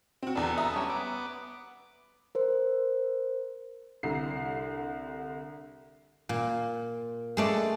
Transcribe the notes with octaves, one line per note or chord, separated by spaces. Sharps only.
C4 F#4
E2 B3 D4 A4
E5 A#5 D#6
G3 C#4
B3 D6
A#4 C5
C2 D3 C7
A#2
G#3 A3 D5